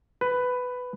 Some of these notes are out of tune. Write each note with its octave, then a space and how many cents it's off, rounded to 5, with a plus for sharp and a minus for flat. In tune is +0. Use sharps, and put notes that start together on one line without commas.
B4 +10